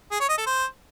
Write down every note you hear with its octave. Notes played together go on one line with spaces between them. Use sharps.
G#4
C#5
D#5
A4
C5